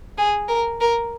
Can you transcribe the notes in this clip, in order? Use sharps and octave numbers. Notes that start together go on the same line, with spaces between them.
G#4
A#4
A#4